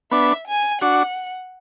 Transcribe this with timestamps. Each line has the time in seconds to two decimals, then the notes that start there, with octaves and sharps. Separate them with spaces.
0.11 B3 D4 E5
0.48 G#5
0.82 D4 F#4 F#5